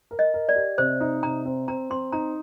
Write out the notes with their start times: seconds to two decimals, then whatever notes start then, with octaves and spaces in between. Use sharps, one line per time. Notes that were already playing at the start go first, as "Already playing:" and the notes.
0.11 A#4
0.19 D#5
0.34 A#4
0.49 D5
0.56 G4
0.78 C3 C5
1.01 D#4
1.23 C3 A#5
1.45 C4
1.68 C4 A#5
1.90 C4 C6
2.12 D#4 A#5